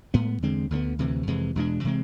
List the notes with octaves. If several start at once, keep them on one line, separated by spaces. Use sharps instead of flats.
A2 G#3 B3
E2 D3 G#3 C4
D2 D3 F3 B3
D2 C3 E3
F2 C3 E3 G#3
E2 B2 G#3 D4
C3 E3 G#3 C4